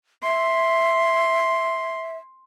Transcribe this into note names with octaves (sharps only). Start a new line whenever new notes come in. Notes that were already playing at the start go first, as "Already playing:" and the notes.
E5 C6